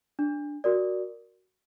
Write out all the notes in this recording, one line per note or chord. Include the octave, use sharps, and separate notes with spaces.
D4
F#4 A#4 D5